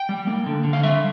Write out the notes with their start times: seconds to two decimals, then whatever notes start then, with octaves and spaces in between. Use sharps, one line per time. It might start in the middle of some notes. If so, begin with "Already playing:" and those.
Already playing: G5
0.09 G3
0.27 A#3
0.46 D3
0.64 D3
0.73 F5
0.83 G3 E5